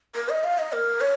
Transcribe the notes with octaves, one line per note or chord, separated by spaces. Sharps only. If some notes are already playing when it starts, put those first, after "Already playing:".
A#4
D#5
F5
D#5
A#4
C#5